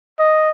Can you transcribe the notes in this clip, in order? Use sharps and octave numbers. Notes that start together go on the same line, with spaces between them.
D#5